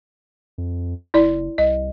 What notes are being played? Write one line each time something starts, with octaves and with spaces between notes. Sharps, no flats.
F2
F#1 E4 D5
C2 D#5